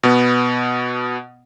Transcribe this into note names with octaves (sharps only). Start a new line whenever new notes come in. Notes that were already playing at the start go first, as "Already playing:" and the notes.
B2 B3